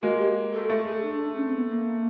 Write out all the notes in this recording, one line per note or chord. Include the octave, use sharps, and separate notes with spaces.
G#3 A#3 F#4
G4
A4
A3 A4
G#4
D4
C#4
C4
B3
A#3